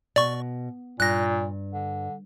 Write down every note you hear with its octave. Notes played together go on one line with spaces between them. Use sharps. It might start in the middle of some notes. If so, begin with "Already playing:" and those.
B2 D5 C#6
G2 A#2 F#6 A#6
D3